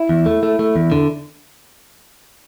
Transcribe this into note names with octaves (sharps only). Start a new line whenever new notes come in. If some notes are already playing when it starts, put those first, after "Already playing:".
Already playing: E4
E2
A3
A3
A3
E2
D3